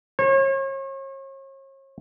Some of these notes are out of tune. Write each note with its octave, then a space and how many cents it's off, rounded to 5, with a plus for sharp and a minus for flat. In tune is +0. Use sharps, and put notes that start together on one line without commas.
C#5 -40